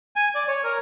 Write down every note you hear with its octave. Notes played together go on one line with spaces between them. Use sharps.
G#5
D5
C#5
A#4